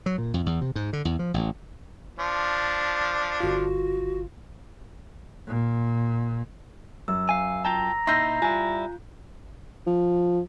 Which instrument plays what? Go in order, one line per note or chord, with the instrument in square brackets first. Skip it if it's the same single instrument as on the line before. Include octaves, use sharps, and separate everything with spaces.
[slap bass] F#3
A#2
F2
E2
C3
G#2
D3
E2
F3
A1
[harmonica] F3 D4
[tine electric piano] G1 F4 [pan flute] F#4
[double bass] A#2
[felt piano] F#2 [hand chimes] E6
[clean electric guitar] F5 G#5
[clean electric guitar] F4 G5 A5 [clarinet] A#5
[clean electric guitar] A#2 D#4 E4 [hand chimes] C6 A#6 C7 [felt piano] E6 G6
[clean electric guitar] G3 E4 [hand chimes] F4 [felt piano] G#5
[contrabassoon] F3